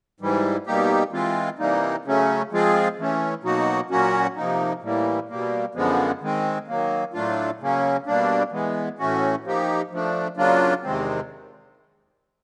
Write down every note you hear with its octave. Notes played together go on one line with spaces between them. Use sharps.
G#2 E3 G3
B2 G3 A#3 D#4 G4
E3 G#3 C4 F4
C3 E3 G3 A#3 D#4
C#3 F#3 A3 C#4
F3 G#3 C4 F4 G#4
E3 A3 C#4
B2 F#3 A#3 D#4 F#4
A#2 F#3 A#3 C#4 F#4
C3 F3 A#3 D#4
A2 E3 G3 A#3
B2 G3 A#3
F#2 D3 F3 G#3 B3
D#3 G#3 C4
D#3 F#3 A#3
A2 F#3 A3 D4 F4
C#3 F#3 A#3 C#4
B2 G3 A#3 D4
E3 G#3 B3
A2 E3 A3 C#4 F#4
F3 A#3 D#4 G4
F3 A3 D4
C#3 F#3 A#3 D4 F4
E2 C3 D#3 G#3 C4